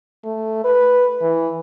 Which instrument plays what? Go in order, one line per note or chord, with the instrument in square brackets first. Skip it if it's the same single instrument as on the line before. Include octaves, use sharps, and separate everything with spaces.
[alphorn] A3
B4
E3